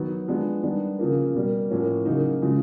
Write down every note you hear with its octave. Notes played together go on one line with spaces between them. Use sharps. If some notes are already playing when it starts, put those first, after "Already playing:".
Already playing: D#3 F#3 B3
F3 G#3 B3 D4
D#3 G3 B3 D4
C#3 F3 A#3
B2 G3 A#3
A2 F3 A#3 C#4
C#3 F#3 A#3 D#4
C#3 F3 G#3